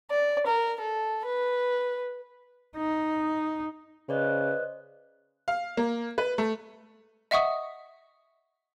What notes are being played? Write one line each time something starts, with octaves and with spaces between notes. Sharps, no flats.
D5
A#4
A4
B4
D#4
C#3 B4 C5 D5 D#5
F5
A#3
B4
A3
D#5 E5 F#5 C#6 D#6